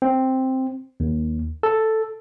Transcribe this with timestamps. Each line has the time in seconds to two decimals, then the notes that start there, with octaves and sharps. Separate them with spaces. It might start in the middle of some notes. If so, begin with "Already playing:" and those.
0.02 C4
1.00 D#2
1.63 A4